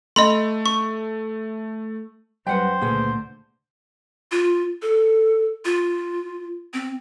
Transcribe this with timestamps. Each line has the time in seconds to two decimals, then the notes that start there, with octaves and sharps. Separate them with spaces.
0.16 A3 D#5 B5 C6
0.66 C#6
2.47 F#2 G3 B4 C5 F#5 G5
2.81 C#2 A#2 D3 A3 G#4 B4 F#5
4.31 F4
4.82 A4
5.65 F4
6.74 C4